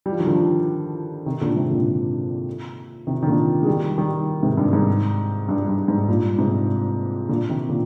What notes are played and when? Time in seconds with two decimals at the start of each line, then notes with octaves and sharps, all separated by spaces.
0.06 G3
0.12 F3
0.20 D#3
0.26 D3 F3
1.26 C3 D#3
1.41 A#2 D3
1.56 G#2 C3
1.71 A#2 D3
3.07 C3 D#3
3.23 D#3
3.27 A#2 D3
3.63 G#3
3.67 D#3 G3
3.98 D#3 G3
4.43 G#2 C3
4.57 G2
4.73 G#2
5.49 G2
5.68 G2
5.88 G#2
6.08 G2 A#2
6.38 G#2 C3
7.29 A#2 D3
7.49 C3 D#3
7.69 A#2 D3